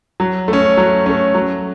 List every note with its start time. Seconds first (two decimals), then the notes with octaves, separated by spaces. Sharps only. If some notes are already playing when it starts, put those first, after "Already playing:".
0.20 F#3
0.48 A3
0.53 C#4
0.77 F#3
1.06 A3 C#4
1.34 F#3